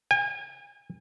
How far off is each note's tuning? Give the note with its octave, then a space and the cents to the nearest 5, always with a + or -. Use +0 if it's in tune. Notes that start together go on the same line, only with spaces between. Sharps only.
G#5 -40